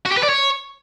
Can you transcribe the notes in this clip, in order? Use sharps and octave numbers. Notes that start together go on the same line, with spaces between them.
F#4
G4
B4
D5
C#5